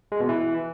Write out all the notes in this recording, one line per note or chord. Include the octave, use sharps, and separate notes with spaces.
G#3
B2
E3